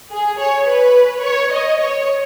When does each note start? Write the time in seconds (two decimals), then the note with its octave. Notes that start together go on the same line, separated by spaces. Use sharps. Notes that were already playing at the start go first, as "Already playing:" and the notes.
0.12 G#4
0.39 C#5
0.68 B4
1.24 C#5
1.52 D#5
1.80 C#5